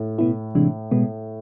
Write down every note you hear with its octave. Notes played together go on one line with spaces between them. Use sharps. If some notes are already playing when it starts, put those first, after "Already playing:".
Already playing: A2
B2 B3 E4
C3 E3 G#3 D4
B2 G#3 B3